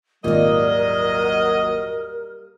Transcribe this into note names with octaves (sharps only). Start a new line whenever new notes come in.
G#1 D#2 A#2 F#3 G3 A#3 A#4 D#5